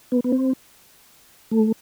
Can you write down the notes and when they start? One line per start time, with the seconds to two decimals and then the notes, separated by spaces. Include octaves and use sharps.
0.12 B3
0.24 B3
0.32 C4
1.51 A3